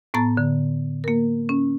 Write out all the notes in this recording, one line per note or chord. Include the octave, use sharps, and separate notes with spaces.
A2 B3 A5 A#5 A6
D3
A#3 A#4
C#4